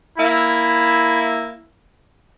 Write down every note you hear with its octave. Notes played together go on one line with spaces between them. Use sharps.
A#3 E4